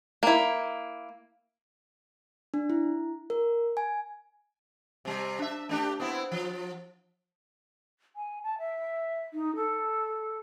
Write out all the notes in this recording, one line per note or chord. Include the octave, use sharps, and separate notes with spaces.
A#3 E4
D4
E4
A#4
G#5
C3 G3
D4 E5
A3 D4 G4
B3 C4 E4
F3
G#5
A5
E5
D#4
A4